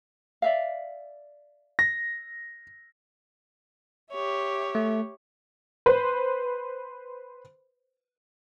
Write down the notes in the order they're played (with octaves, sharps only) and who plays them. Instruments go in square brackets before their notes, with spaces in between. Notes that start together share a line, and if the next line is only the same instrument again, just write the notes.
[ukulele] D5 E5 F5
[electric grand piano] A#6
[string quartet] G4 C#5 E5
[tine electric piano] A3
[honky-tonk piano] B4 C5